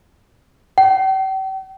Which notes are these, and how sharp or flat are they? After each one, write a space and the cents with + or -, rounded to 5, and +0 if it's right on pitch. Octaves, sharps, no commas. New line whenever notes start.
G5 -45